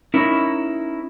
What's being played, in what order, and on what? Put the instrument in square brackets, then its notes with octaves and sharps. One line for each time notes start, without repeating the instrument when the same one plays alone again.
[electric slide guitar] C#4 D#4 E4 A#4